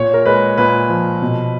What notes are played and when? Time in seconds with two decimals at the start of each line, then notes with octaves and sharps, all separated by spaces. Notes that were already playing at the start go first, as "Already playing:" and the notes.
Already playing: A#2 C#5
0.14 A#4
0.25 G#3 B4
0.57 A#2 B4
0.89 F3
1.22 B2